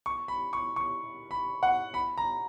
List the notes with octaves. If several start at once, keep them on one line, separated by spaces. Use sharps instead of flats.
C#6
B5
C#6
C#6
B5
F#5
B5
A#5